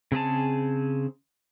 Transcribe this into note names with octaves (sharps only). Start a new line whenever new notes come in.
C#3 C4 G#4 A5